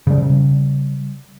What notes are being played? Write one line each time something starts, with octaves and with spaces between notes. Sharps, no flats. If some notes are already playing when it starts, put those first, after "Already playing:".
C#3 G3